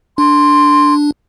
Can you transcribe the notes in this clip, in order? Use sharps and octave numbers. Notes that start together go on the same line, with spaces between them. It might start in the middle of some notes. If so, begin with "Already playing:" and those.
D4 C6